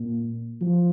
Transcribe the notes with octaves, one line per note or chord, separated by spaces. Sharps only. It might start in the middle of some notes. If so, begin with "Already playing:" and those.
Already playing: A#2
F3